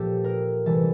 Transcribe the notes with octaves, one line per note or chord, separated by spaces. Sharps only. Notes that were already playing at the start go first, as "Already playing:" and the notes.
Already playing: A#2 F3 G4 A4
A#4
C3 E3 G3 A4